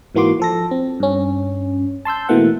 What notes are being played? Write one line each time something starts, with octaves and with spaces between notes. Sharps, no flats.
G#2 E3 A#3 F#4 C6 D6
F3 A4 A#6
C4
G2 C#4
A5 C6 E6 G6
B2 E3 A3 A#3 F#5